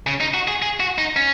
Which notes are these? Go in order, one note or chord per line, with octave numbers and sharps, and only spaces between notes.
C#3
D#4
F#4
G#4
G#4
F#4
D#4
C#4